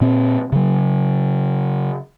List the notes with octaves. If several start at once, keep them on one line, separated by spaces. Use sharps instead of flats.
A#2 C4
C#3 F#3